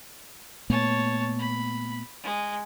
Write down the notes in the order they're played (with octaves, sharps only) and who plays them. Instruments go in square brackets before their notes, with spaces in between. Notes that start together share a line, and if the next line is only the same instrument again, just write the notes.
[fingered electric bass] A#2 A3 B3 [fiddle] C#5 A5
[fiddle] B5
G#3